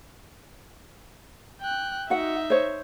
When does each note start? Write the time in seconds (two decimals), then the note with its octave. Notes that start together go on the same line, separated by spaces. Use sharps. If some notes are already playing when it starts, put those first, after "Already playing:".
1.62 G5 F#6
2.10 D#4 F#4 E5 F#5
2.50 C5 C#5